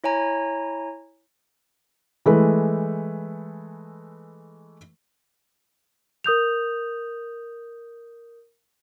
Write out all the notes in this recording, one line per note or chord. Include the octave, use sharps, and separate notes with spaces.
E4 C#5 G#5 A#5
E3 G#3 A3 B4
A#4 D#6 G6 F7